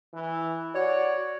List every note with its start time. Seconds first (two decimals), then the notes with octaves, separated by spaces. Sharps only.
0.14 E3
0.75 F#4 C#5 D5